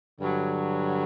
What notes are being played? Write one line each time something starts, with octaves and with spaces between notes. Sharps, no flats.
G2 D3 F#3